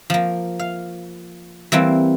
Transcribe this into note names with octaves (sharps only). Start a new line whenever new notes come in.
F3 A#3
F5
E3 G3 A#3 C4